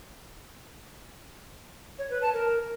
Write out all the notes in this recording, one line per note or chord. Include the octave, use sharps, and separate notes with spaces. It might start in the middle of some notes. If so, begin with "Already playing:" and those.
C#5
B4
A5
A#4